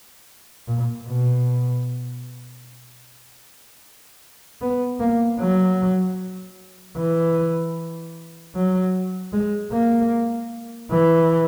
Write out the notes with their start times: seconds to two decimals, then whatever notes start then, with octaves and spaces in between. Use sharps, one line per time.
0.67 A#2
1.07 B2
4.61 B3
5.00 A#3
5.39 F#3
6.97 E3
8.55 F#3
9.33 G#3
9.72 A#3
10.91 E3